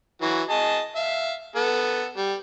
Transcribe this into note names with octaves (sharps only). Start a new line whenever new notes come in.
E3 F#3 F#4
G#4 D#5 A5
E5 F5
B3 A4
G3